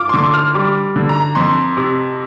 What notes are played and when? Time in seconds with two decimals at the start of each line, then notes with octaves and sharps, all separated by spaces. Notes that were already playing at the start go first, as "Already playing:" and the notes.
Already playing: F4 D6 F6
0.09 C6
0.13 D3 D6
0.33 F6
0.54 G3 D6
0.96 D3
1.09 A#5
1.35 F2 C6
1.77 C3